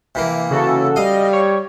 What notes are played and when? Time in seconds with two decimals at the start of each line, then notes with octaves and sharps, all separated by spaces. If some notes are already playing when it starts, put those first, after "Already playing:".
0.15 C3 E3 A#3
0.51 C#3 F#4 A4
0.96 G3 D#5 F5
1.33 C#5